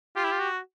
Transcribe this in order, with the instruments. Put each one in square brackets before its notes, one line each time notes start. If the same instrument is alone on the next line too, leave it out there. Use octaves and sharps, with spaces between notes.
[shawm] F4 [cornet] G4
[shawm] E4
F4
F#4